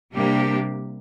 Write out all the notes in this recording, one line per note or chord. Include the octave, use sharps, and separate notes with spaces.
C3 G3 A#3 D4 G4